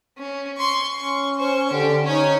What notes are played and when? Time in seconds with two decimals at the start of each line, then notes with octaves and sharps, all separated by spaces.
0.18 C#4
0.57 C6 C#6
0.96 C#4 C#6
1.38 C5 C#6
1.72 D3 G4
2.05 C#4 D#4 C#5